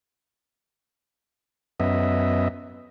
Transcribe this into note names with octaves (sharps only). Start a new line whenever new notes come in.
F#2 B3 D#5 E5